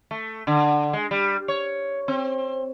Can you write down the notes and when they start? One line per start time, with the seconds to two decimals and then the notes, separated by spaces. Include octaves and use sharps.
0.11 A3
0.47 D3
0.93 G#3
1.11 G3
1.48 C#5
2.08 C4